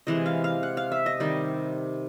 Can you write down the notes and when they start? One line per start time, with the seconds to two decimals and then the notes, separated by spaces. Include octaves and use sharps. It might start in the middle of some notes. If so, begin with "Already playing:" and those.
0.07 C3 E3 G#3 D#5
0.26 F5
0.44 F5
0.63 F#5
0.77 F5
0.92 E5
1.06 D#5
1.20 C3 D#3 G3